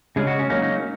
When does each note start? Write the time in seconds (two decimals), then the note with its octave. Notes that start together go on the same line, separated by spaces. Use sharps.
0.16 C#3 G#3 C#4 G#4
0.27 F#4
0.39 C#4
0.50 F#3 A#3 C#4 D#4
0.62 D#4